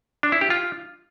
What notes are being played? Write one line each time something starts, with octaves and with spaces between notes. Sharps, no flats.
D4
E4
G4
F4